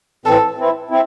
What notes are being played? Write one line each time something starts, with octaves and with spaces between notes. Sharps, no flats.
A2 E3 C4 A4
E3 C4 E4
C4 E4